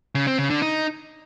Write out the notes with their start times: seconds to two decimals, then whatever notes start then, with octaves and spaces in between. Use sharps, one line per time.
0.15 C#3
0.27 C4
0.39 C#3
0.50 D3
0.62 D#4